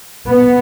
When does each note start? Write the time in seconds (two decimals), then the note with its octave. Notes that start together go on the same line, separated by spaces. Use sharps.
0.29 B3